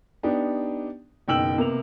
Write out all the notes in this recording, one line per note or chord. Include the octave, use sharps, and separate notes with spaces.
B3 D4 D#4 G4
F#1 B2 D#3 G5 E6 F#7
C3 A#3 B3 F7